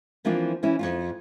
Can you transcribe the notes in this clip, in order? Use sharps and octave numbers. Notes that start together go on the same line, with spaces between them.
E3 F3 A#3 C4 D4 F4
E3 C#4 E4
F2 G#2 F4